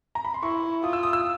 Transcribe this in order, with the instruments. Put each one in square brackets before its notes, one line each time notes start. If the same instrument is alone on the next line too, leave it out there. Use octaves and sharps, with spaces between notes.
[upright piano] A#5
B5
C6
[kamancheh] E4 [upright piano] C#6
[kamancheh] F4 [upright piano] D#6
[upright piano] E6
D#6
E6